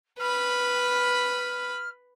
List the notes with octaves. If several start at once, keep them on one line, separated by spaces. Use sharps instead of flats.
B4 B5 F6